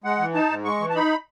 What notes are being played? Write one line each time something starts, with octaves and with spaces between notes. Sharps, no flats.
G#3 F#5
E3
D#4 A5
G#2
G#3 C#6
E3
A5
D#4 B5